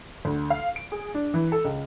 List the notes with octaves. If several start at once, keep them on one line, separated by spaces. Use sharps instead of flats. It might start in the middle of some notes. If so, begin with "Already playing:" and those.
D2
F5
D7
G#4
D4
E3
A4
C#2